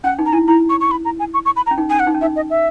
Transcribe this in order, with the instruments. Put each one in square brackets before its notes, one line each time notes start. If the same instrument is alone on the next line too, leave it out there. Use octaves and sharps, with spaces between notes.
[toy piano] C#4 [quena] F#5
[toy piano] D#4
[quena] A#5
[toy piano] E4 [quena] G#5
[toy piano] E4 [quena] A#5
[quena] C#6
C#6
B5
A#5
G#5
C#6
C#6
B5
A#5
[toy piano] C#4
D#4
[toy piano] C#4 [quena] G#5
[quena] F#5
[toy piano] D#4
C#4
[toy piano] D#4 [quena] E5
[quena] D#5
E5